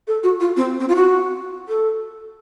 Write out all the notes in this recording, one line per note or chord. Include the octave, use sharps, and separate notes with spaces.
A4
F#4
F4
C4
C4
F4
F#4
A4